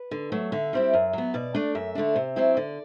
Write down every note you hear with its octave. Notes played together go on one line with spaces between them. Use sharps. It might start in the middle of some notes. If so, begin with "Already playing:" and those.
Already playing: B4
D3
F#3 A3
D3 E5
G3 C4 E4
F#2
F#3 B3
B2 D5
A3 D4
F#2 E5
D3 A3 D4
C3
F#3 C4 E4
D3 D5